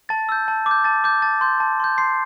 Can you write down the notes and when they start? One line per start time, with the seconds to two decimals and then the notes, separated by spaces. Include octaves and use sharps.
0.09 A5 A6
0.29 E6 G6
0.48 A5
0.66 D6
0.71 G6
0.84 A5 A6
1.04 D6 G6
1.22 A5 A6
1.41 C6 G6
1.60 A5
1.80 C6 G6
1.98 C6 C7